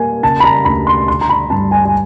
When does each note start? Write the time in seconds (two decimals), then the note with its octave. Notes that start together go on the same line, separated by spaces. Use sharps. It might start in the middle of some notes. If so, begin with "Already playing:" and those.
Already playing: A#3 G#5
0.23 C#3 A5
0.40 B5
0.44 A#5
0.65 D2 B5
0.87 C6
1.08 D3 C6
1.21 A#5
1.29 B5
1.50 G2 A5
1.71 G#5
1.85 G#5